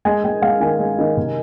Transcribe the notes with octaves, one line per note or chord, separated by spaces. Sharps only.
G#3 G#5
G#3 G5
G#3 F5
D#3 G#5
G#3
D#3
C3